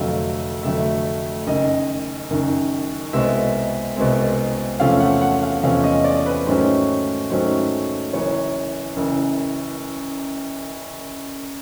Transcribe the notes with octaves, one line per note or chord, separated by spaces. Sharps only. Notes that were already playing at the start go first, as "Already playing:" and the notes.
Already playing: F1 F2 D3 F#3 A3 F5
F1 F2 D3 F#3 A3 E5
F#1 F#2 D#3 D#5
F#1 F#2 D#3
C2 B2 G#3 C4 E5
C2 B2 G#3 C4
E2 C3 F3 A3 C#4 F5
F#5
F#5
F5
E2 C3 F3 A3 C#4 F5
D#5
D5
B4
G#2 D#3 F#3 A3 C#4 C5
G#2 D#3 F#3 A3 C#4 C5
F#1 F#2 C#3 E3 C#5
F#1 F#2 C#3 E3